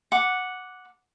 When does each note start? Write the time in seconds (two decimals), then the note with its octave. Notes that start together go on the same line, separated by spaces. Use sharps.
0.12 F#5 D6